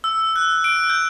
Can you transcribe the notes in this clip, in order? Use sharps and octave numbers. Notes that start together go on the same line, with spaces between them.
E6
F#6
D7
G6